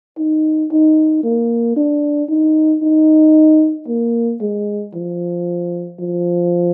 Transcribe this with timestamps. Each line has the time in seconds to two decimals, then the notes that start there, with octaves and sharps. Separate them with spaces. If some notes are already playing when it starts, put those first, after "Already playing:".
0.17 D#4
0.71 D#4
1.24 A#3
1.76 D4
2.29 D#4
2.82 D#4
3.88 A#3
4.41 G#3
4.94 F3
5.99 F3